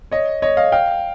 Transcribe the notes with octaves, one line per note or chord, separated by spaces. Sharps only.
C#5 D#5
C#5 D#5
D#5 F5
F5 G5